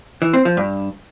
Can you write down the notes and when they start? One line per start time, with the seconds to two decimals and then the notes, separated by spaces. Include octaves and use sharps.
0.22 E3
0.33 C4
0.45 F3
0.57 G2